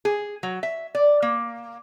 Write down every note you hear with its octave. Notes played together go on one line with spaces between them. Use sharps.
G#4
F#3
E5
D5
A#3